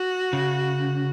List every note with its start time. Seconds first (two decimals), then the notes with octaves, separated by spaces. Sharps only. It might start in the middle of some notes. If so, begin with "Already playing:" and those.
Already playing: F#4
0.33 C#3